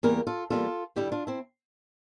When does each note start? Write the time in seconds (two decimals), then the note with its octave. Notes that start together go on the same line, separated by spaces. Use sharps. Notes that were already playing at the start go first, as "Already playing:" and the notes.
0.03 E2 E3 G3 A#3 G4 A#4
0.27 F4 A4
0.50 E2 E3 G3 A#3 F4 A4
0.96 G2 D3 G3 E4 G4
1.12 D4 F4
1.27 C4 E4